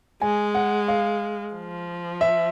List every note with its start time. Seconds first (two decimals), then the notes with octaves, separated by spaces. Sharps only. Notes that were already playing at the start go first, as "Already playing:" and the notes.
0.22 G#3 G#5
0.55 F#5
0.88 F5
1.54 F3
2.21 E5